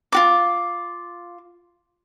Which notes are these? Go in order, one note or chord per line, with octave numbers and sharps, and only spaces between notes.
F4 F#4 D6